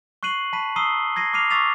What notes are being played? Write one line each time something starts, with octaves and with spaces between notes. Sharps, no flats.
C#6 F#6 C7 D#7 F#7
A5 B5 C#6 F#6 B6 D#7
A#5 D#6 E6 C7 D#7 G7
G#6 A#6 C7 D#7
D6 F6 C7 D#7 F7
C#6 D6 E6 A6 B6 F7